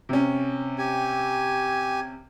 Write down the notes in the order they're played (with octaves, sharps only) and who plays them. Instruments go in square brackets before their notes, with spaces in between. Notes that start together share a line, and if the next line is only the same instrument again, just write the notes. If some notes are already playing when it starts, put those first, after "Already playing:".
[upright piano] C3 C#4
[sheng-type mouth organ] G4 G#5